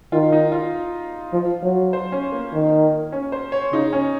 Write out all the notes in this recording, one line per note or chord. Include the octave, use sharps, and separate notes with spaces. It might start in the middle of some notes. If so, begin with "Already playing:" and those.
D#3 F4
D#4
F4
F3
F#3
C5
C#4
A#3
D#3
C#4
C5
C#5
C#3 D#4
C#4